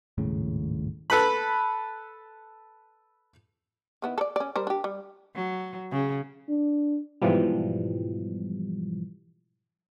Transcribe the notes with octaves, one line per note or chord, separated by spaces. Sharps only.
D#1 G#1 A2 C#3
A4 B4 B5
D#3 B3 E4
A4 D5
C#4 D5
G3 A#4 C5
D4 G4
G3
F#3
C#3
D4
G#2 B2 E3 F3 G3